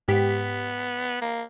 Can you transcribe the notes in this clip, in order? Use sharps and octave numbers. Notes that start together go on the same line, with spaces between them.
G#2 B3 G4 B6
A#3